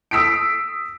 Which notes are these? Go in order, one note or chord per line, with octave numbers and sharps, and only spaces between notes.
D#6 E6 B6 C7 D7